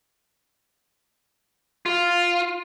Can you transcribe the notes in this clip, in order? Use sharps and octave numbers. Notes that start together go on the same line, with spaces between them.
F4